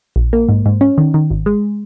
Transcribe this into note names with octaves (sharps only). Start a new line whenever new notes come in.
A#1
A#3
G#2
G#2
C#4
D#3
D#3
G#1
G#3